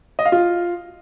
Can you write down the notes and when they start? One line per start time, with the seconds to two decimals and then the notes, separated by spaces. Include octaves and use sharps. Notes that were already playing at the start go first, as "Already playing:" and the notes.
0.19 D#5
0.25 F5
0.32 F4